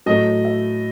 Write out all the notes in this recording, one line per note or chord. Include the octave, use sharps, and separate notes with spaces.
A2 F#3 A3 D#5
E5